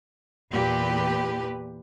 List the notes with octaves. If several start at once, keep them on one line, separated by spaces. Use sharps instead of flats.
E2 A#2 G4 B4